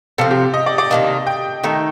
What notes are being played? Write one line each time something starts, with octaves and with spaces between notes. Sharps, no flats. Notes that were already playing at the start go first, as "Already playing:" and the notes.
C3 F3 C4 A4
G4
D#5
D5
D5
C3 D#3 A#3 D4 D#5
G5
D#3 A3 D#4 A4